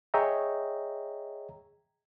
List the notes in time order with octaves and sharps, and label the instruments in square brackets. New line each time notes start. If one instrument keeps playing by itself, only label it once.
[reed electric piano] G#4 C#5 D#5 E5 G5 A#5